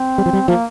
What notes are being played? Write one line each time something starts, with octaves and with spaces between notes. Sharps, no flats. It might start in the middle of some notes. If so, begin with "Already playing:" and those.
Already playing: C4
G3
F3
G3
F3 A#3